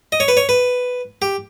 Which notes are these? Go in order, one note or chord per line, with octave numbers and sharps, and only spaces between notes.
D#5
C#5
B4
C#5
B4
G4